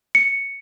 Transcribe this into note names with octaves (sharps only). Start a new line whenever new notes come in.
C#7